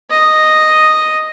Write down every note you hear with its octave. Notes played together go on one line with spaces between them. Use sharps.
D#5